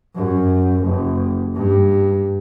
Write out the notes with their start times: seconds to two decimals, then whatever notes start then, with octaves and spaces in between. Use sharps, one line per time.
0.15 F#2
0.84 F#1
1.55 G2